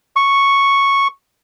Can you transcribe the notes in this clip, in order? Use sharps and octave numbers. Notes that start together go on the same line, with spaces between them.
C#6